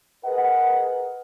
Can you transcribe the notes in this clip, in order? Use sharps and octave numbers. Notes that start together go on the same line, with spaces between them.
G#4 A#4 B4 D#5 F#5